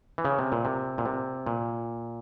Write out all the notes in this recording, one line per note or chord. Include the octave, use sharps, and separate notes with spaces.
E3
C#3
C3
A#2
C3
A#2
C3
A#2